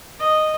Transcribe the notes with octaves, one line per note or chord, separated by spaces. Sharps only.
D#5